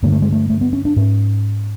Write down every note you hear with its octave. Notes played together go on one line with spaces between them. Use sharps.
G2 D3 A#3
A3
G#3
A3
A3
B3
C#4
D4
G#2 C#4